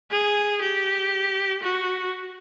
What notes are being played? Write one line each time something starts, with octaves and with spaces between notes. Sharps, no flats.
G#4
G4
F#4